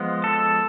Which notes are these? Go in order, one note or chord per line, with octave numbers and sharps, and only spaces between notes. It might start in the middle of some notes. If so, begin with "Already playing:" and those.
Already playing: F3 G#3 B3
A4